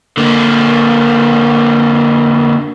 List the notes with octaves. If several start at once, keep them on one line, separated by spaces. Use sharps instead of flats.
D3 A#3